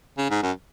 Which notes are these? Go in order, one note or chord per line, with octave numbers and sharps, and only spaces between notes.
C#3
G#2
F#2